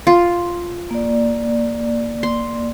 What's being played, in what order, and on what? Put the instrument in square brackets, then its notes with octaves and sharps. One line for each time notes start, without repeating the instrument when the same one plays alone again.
[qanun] F4
[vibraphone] A#3 D5
[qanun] C6